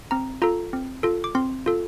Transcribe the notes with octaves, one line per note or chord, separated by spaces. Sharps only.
C4 A#5
F4 A4 A#5
C4
F4 A4
D6
C4 C6
F4 A4